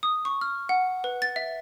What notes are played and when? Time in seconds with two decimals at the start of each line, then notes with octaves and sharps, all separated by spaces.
0.03 D#6
0.25 C#6
0.41 F6
0.69 F#5
1.04 B4
1.22 A6
1.36 E5